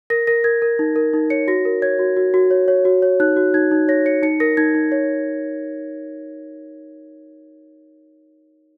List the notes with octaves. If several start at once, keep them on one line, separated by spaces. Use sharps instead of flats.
A#4 A#6
A#4 A#6
A#4 G#6
A#4
D#4
A#4
D#4
C#5 C#7
F#4 A#6
A#4
C#5 G#6
F#4
F#4
F#4
C#5
C#5
F#4
C#5
D#4 F#6
F#4
D#4 G#6
D#4
C#5 A#6
C#5 C#7
D#4 C#7
A#4 A#6
D#4 G#6
D#4
C#5